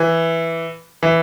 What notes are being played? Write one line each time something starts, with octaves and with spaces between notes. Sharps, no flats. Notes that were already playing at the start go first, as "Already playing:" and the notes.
Already playing: E3
E3